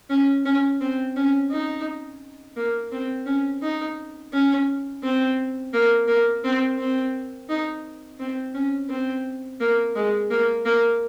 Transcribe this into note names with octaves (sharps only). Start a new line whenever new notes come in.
C#4
C#4
C4
C#4
D#4
A#3
C4
C#4
D#4
C#4
C4
A#3
A#3
C4
C4
D#4
C4
C#4
C4
A#3
G#3
A#3
A#3